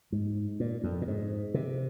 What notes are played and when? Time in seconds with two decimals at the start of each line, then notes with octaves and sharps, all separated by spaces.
0.12 G#2
0.60 A#2
0.84 F2
1.02 A#2
1.08 G#2
1.54 C3